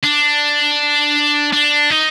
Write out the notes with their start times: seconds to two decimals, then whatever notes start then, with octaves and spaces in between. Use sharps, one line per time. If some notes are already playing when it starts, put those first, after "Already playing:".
0.03 D4
1.53 D4
1.90 D#4